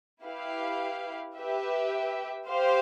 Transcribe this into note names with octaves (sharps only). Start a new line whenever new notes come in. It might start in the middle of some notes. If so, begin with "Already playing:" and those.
E4 G4 B4 F5
G4 B4 E5
G4 C5 F5